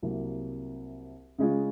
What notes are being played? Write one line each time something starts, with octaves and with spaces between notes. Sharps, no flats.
C2 C3 F#3 A#3
C#3 G#3 C#4 F4